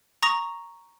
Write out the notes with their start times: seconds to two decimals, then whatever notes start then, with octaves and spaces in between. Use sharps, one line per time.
0.22 A#5 C#6 D#6 A#6 F7